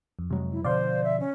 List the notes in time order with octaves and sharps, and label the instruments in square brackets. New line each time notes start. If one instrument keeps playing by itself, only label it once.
[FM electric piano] F2
[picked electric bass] C3 F#3 G#3
[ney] E4
[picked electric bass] B2 D3 F3 [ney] C5 [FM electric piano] D5 F5 C6
[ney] E5
C#4